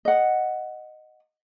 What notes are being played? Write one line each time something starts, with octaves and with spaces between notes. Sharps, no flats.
D#5 F#5